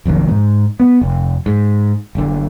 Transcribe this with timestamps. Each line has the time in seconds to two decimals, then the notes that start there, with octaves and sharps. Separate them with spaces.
0.06 F1 A#1 F#2 D#3
0.28 G#2
0.80 B3
1.01 F1
1.46 G#2
2.15 F#1 D3